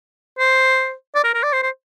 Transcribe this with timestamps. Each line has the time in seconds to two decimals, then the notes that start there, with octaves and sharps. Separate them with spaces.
0.39 C5
1.15 D5
1.24 A#4
1.34 A#4
1.43 D5
1.53 C5
1.63 C5